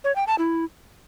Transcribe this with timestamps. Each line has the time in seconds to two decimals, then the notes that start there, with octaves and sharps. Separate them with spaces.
0.04 C#5
0.16 G5
0.27 A5
0.39 E4